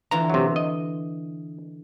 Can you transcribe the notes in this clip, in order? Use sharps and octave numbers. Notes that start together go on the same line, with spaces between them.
D3 E3 F4 A#5
C3 F#3
D#5